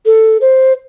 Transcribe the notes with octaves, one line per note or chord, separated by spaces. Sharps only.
A4
C5